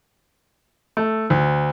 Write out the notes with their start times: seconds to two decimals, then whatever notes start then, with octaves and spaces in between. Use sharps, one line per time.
0.97 A3
1.30 D2